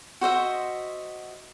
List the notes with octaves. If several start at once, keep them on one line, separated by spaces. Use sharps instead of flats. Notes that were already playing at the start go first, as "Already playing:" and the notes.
F#4 C5 D#5 E5